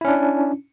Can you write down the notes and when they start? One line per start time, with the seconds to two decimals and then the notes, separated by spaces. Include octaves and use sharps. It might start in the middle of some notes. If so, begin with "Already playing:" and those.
0.01 E4
0.05 C#4
0.08 D4